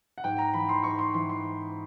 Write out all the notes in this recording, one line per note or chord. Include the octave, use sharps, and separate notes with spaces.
F#5
G#2 G5
A#5
E3 B5
C6
G#2 C#6
C6
E3 C6
C6